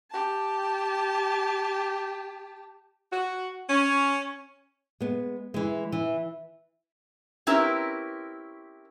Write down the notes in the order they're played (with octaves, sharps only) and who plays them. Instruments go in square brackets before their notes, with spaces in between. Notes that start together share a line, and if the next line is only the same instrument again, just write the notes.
[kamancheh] G4 A5
[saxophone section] F#4
C#4
[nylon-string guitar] G#3 B3
E3 G#3
E3
[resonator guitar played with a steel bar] C4 C#4 E4 G4 A#4 B4